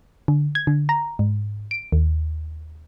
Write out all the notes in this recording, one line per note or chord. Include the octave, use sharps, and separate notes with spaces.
D3
G#6
D3
A#5
G#2
D7
D#2